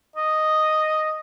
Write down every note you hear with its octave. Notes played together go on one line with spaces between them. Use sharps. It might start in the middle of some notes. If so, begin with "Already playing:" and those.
D#5